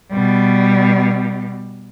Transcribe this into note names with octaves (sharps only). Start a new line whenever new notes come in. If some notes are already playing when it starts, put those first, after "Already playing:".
B2 G3